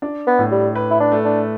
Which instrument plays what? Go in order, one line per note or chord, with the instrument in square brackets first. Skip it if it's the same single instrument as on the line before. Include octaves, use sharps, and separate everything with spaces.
[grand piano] D4
[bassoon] B3
[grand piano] A2
[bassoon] G3
[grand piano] B4
[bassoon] E4
D4
[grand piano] A3
[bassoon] D4